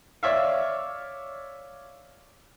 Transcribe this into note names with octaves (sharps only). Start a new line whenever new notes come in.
C#5 D5 E5 F5